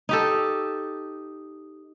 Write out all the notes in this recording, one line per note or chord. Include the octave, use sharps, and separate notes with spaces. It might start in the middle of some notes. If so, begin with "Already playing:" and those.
D#4 G4 A4